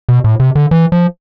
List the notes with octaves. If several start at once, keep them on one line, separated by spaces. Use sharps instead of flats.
B2
A2
C3
D3
E3
F3